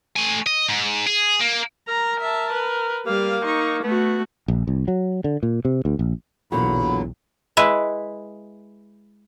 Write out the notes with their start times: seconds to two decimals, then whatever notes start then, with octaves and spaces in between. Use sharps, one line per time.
0.16 A3 G#5
0.46 D#5
0.69 G#2
1.07 G#4
1.40 A#3
1.88 A#4 A#5
2.20 E5 A5
2.53 B4
3.06 G3 A#3 F5
3.44 D#4 C#6
3.84 A3 B3 F#4
4.48 A#1
4.67 C2
4.88 F#3
5.24 D3
5.43 A#2
5.65 C3
5.85 D2
5.99 A#1
6.52 B1 E2 A#2 D3 F#3 B5
7.57 G#3 E4 B4 E5